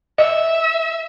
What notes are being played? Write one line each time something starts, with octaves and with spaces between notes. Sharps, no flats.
D#5 E5